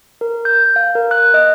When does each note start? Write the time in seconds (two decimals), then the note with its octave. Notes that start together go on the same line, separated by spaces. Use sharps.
0.21 A#4
0.45 G6
0.76 F5
0.95 A#4
1.11 F#6
1.34 D#5